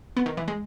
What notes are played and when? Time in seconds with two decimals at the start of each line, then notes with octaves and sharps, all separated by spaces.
0.17 B3
0.26 D#3
0.37 E3
0.48 G#3